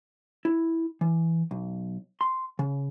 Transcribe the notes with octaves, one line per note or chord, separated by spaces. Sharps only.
E4
E3
B1
C6
C#3